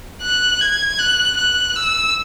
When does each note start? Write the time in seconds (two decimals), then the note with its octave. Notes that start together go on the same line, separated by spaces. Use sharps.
0.22 F#6
0.60 G#6
0.99 F#6
1.36 F#6
1.75 E6